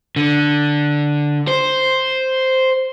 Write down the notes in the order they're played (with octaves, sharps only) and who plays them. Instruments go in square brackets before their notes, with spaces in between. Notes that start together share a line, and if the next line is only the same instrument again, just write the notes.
[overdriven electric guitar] D3
C5